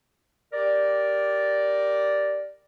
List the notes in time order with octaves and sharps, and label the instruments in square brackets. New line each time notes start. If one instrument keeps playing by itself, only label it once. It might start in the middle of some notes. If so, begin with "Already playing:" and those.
[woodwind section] G4 A#4 D5